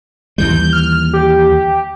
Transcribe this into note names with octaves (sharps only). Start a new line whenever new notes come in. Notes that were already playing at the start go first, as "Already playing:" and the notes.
D#2 E3 G3 G6
F6
G4